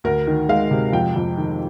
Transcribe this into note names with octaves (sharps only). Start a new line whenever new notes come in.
D2 A#4
D#3
G#3 F5
C3
F2 G5
F2
D#3